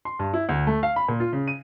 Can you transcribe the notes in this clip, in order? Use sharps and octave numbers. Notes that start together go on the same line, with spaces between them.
C6
G2
E4
D2
A3
F5
B5
A#2
F4
C#3
D#7